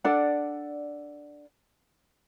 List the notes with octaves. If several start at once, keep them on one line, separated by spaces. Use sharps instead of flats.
D4 A4 D5 F#5